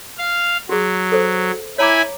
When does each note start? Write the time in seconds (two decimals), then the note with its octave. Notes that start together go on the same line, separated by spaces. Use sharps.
0.18 F5
0.69 F#3 F#4 G#4
1.12 A4 C5
1.78 E4 C#5 G#5 A#5 B5 D6